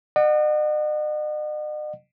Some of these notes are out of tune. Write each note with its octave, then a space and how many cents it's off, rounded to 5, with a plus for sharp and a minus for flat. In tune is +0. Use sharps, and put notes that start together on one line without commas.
D#5 -45 F#5 +0